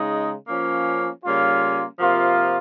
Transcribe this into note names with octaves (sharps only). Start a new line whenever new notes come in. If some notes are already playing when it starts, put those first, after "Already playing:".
Already playing: C#3 G#3 D#4
F3 A#3 C#4
C#3 G3 A#3 C#4 F4
C3 F3 A#3 F4